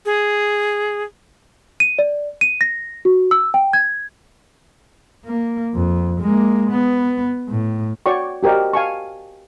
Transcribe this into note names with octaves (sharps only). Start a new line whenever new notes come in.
G#4
D#7
D5
D#7
A#6
F#4
E6
G5
G#6
A#3
F2
G#3 A#3
B3
A2
F#4 C#5 D5 G5 C#6
F#4 G4 A#4 C5 D5 D#5
F5 G#5 A5 C#6